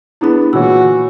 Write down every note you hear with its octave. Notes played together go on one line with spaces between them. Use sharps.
B3 D4 E4 G#4 B5
A#2 E3 F#4 C#5 E6